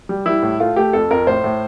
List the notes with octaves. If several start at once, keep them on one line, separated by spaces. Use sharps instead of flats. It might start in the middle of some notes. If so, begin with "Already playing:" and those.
G3
G3 E4
A2
A3 F4
A3 G4
F2 A4
F2 A#4
A2 C5
A2